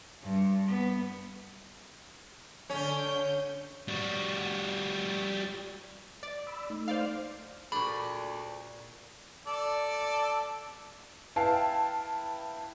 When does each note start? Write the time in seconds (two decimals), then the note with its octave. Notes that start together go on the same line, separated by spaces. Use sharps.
0.22 G2
0.67 B3
2.70 D3 C#4 G6
3.88 G3 F#4
6.23 D5
6.47 B5 E6
6.70 A3 D#4
6.88 C5 D5 F5
7.72 D2 A#2 D4 G#4 B5 C#6
9.47 A4 D5
11.36 E4 B4 F5 G5 A5